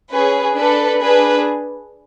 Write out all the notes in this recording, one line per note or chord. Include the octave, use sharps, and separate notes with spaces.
C#4 G#4 B4
D4 A4 B4
D4 G#4 B4